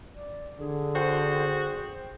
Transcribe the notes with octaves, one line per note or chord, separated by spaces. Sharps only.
D5
D3 G#4
F#4 C5 G5